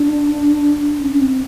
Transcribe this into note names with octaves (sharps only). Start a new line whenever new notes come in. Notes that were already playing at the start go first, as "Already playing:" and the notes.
Already playing: D4
C#4
C#4
C4